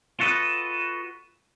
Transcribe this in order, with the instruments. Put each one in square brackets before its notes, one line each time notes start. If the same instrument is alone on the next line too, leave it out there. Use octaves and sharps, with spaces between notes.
[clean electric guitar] F4 F#4 A4 B4 D#5